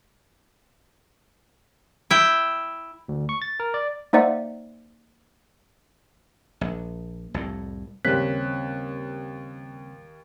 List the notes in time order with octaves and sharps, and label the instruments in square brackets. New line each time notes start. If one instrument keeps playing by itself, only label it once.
[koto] E4 G5
[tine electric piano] D2
C#6
A6
A#4
D5
[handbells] A#3 D#4 C5 D5 E5 F#5
[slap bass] A#1
C2 F2 A2
[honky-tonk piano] D#2 F#6 [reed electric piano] C#3 G3 A#3 [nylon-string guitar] C4 C#4 [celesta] B6